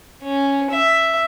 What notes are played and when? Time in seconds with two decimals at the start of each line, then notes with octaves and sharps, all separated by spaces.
0.22 C#4
0.70 E5